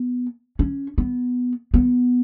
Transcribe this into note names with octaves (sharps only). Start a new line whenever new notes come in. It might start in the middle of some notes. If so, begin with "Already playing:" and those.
Already playing: B3
C#4
B3
B3